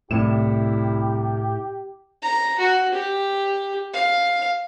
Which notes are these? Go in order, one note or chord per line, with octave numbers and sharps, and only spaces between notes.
C2 A2 E4 G4 E7
A#5
F#4
G4
F5